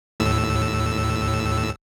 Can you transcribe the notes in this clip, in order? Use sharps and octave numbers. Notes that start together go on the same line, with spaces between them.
D#2 A2 E6